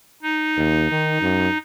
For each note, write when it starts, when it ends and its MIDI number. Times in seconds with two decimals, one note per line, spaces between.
0.22 1.58 63
0.57 0.90 39
0.91 1.18 51
1.21 1.48 42